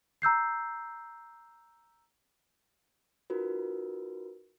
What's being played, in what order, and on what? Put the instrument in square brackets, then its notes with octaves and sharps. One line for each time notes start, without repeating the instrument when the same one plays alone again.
[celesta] A#5 E6 G6 C7
[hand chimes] D#4 F4 F#4 A#4 B4